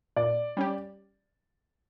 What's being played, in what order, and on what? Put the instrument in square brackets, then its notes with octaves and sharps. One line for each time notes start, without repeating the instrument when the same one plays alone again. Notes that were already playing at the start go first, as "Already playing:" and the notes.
[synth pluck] A#2 [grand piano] D5
[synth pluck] G3 C#4 G4